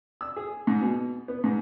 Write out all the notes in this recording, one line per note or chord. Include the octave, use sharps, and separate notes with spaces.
E6
G#4
G#2
B2
B3
G#2